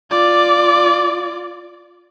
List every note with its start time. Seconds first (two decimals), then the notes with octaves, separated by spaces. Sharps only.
0.11 F4 D5